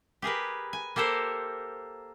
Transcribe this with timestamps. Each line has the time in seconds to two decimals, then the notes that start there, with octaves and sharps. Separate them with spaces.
0.22 G4 G#4 A#4 B4
0.73 G#5
0.96 A#3 G4 A4 A#4 C5